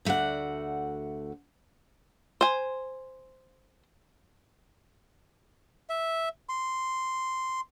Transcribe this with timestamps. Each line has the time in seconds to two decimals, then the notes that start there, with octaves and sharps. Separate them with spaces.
0.05 D2 A3 F#4 D5 F#5
2.41 C5 G#5
5.90 E5
6.49 C6